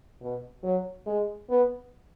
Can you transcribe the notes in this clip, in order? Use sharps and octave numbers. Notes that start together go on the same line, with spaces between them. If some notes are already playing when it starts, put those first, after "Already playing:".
B2
F#3
G#3
B3